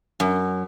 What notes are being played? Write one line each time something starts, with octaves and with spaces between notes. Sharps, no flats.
F#2